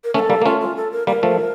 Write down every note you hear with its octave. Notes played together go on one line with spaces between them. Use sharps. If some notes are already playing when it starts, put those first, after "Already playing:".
A#4
A3 C#4 A#4
A4
G3 A#3
A#3
A3 C#4 F4
F4
A4
A#4
G3 A#3 A#4
F3 A3